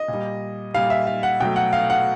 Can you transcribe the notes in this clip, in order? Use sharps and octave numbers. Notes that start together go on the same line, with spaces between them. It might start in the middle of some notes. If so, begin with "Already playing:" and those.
Already playing: D#5
A#2
G3
A#2 G3 F5
E5
F5
F#5
B2 F#3 A3 G5
F#5
F5
F#5